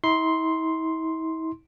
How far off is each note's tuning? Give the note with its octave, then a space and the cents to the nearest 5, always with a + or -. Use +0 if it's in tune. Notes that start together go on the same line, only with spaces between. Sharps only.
E4 -45 C6 +0